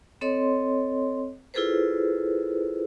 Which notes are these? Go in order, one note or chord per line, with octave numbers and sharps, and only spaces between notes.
C4 A4 C#5 D#5 C6
E4 F4 G#4 A4 B4 C5